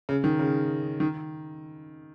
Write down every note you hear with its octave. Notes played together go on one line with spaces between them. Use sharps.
C#3
D#3
C#3
D#3